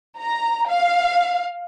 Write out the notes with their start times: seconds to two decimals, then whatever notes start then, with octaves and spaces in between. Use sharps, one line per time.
0.20 A#5
0.69 F5